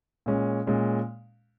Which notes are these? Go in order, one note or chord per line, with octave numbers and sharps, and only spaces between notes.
A#2 G#3 C#4
A#2 G#3 C#4